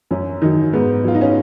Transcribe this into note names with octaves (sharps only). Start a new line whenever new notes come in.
F#2 C#4
D#3 F#3 D#4
G#2 B3
F#3 F4
D#4
C#4